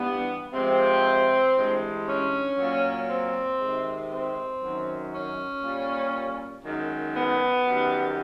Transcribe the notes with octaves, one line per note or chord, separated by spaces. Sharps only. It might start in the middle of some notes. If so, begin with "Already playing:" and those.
Already playing: G2 E3 G3 B3
C3 F3 G#3 C4
G2 E3 G#3
C#4
A#2 F#3
C4
C3 D#3 G#3
C4
F#2 D#3 F#3
C#4
A#2 G3
F#2 D#3 G#3
B3
F#2 D#3 G3